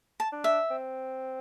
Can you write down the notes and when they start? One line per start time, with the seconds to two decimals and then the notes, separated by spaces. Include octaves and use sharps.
0.20 A5
0.32 D4
0.44 E5
0.71 C4